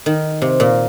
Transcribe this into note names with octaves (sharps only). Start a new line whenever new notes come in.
D#3
C3
A#2